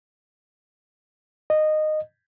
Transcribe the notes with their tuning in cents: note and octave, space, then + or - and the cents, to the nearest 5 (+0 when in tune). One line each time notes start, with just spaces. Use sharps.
D#5 -15